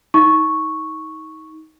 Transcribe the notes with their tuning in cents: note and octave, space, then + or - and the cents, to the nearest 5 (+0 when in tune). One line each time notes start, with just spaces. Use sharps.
D#4 +30 C#6 +0